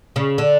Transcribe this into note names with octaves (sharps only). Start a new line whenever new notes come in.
C#3
D3